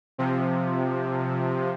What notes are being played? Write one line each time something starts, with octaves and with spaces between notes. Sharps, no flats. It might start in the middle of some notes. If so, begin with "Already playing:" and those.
C3 F3